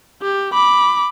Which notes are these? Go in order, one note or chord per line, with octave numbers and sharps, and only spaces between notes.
G4
B5 D6